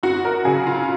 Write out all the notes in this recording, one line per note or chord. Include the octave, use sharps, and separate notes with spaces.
F#2 F#4
A#4
C#3 F#3 G#4
F4